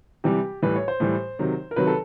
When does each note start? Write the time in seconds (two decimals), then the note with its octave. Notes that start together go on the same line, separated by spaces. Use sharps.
0.24 C3 E3 G3 G4
0.63 A2 E3 G3 B4
0.76 C#5
0.88 C5
1.00 A2 E3 G3
1.39 C3 D#3 F#3
1.71 A#4
1.76 C3 D#3 F#3 B4
1.87 A4